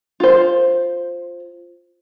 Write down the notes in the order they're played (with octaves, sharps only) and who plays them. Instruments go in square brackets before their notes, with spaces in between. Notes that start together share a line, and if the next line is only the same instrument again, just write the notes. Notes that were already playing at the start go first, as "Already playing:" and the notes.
[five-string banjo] F4 C5